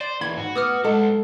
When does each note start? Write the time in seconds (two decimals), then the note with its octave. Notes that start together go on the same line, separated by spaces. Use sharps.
0.01 C5 D5
0.21 E2 D#3 A#3 B5 G#6
0.38 G#2 F#4
0.55 B3 D6 D#6 F6
0.84 B1 G#3 A4 D#5 F#5